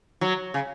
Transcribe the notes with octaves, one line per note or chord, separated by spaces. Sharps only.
F#3
C#3